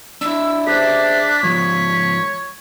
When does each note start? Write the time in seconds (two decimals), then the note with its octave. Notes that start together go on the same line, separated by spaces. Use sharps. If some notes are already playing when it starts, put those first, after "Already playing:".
0.21 D4 E4 E6
0.67 D4 G#4 C5 E5 B6
1.43 G#2 F3 C#5